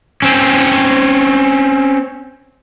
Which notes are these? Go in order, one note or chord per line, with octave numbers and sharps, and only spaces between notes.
C4 C#4